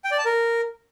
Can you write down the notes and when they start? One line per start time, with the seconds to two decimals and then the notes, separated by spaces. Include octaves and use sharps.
0.04 G5
0.11 D5
0.18 A5
0.25 A#4